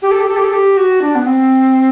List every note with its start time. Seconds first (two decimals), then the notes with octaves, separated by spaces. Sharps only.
0.02 G4
0.11 A4
0.20 G4
0.28 A4
0.36 G4
0.44 A4
0.53 G4
0.77 F#4
1.02 D4
1.15 B3
1.26 C4